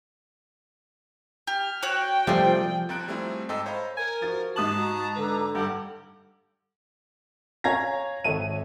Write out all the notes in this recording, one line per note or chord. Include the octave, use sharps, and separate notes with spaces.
G4 F6
F#4 C#5 G5 F#6
C3 F3 G3 A3 F4 G#4
D#2 F3 C4 A#5 F#6 D7
G3 A3 C4 E4 F4 G#4
G#2 A4 D#5 G5 A5 E6
C5 C#5 D#5 F5 A#5 B5
A#4 G#5
F3 F#4 A6
G#2 G4 A5 D#6 F#7
F#4 A#5
D3 B4
G2 G4 F#5
C#5 F5 G#5 A#5 G#6 A#6
G#1 A4 C#5 E5 D#7